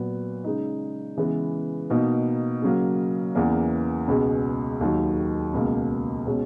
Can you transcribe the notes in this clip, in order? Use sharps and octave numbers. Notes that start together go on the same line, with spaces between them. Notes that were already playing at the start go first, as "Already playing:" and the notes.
Already playing: A#2 F#3 B3
C#3 G#3 D#4
C#3 E3 G#3 B3
B2 A#3 D#4
C#3 F#3 A#3
E2 C#3 E3 A#3
C#2 B2 G#3
D#2 D#3 F#3
C#2 B2 A#3
B2 G#3 C#4